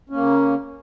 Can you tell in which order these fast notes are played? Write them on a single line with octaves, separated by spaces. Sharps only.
C#4 A#3 C#3